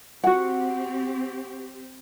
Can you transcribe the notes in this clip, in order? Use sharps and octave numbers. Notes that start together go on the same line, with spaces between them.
C4 F#4 G4 F#5